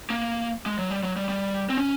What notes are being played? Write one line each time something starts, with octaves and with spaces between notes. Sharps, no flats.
A#3
G#3
F#3
G3
F#3
G3
G3
C4
C#4